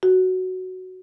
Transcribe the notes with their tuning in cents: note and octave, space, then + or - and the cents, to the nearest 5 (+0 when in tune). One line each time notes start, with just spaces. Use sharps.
F#4 +5